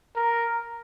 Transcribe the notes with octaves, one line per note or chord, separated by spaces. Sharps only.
A#4